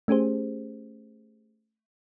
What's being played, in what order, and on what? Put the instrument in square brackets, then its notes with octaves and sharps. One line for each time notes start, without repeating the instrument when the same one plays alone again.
[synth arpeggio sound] A3 C#4 G4 G#4 C5